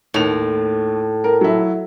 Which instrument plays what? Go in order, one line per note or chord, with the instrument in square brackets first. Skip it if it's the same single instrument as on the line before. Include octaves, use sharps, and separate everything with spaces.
[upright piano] D#2 F7 [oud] A2
[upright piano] A#4
F#3 E4